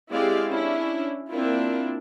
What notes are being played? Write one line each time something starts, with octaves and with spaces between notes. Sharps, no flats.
G#3 C4 E4 G4 D5 F5
C#4 D4 E4
A#3 C4 D4 E4 F4